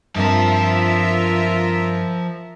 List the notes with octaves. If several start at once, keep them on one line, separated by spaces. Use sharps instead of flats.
G2 F3 C4 F4 A#4 E5 A5